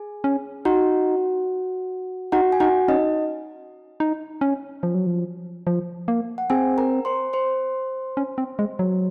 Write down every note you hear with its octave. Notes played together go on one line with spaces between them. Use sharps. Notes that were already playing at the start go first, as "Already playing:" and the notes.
Already playing: G#4 G#5
C#4
D#4 F#4 F#5
D#4 F#4 F#5
G#5
D#4 F#4 F#5
C#4 D#4 D#5
D#4
C#4
F3
F#3
F3
F3
A#3
F#5
C4 G#4 G#5
A#4 A#5
C5 C6
C5 C6
C#4
C4
G#3
F#3